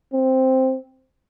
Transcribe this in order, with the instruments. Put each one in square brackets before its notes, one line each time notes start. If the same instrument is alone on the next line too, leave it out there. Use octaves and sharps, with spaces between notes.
[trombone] C4